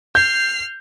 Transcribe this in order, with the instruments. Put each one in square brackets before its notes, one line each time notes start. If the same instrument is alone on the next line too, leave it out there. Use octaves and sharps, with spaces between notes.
[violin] F6 C7 [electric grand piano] G6